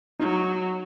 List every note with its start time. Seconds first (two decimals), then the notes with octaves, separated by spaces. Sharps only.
0.19 F#3 D#4